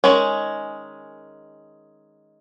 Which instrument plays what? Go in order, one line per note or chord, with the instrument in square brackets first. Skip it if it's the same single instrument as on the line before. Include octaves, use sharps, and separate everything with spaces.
[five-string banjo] D#3 G#3 C#4